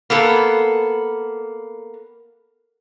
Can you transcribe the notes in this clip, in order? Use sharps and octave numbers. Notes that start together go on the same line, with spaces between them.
A#3 B3 A4